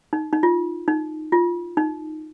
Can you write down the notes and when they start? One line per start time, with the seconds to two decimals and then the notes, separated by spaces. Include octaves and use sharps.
0.13 D#4
0.33 D#4
0.43 F4
0.88 D#4
1.32 F4
1.77 D#4